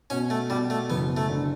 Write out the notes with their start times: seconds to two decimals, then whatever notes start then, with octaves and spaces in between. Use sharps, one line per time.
0.10 B2 C#4
0.30 A3
0.50 B2 G3
0.70 A3
0.90 F#1 B3
1.17 A3
1.30 D3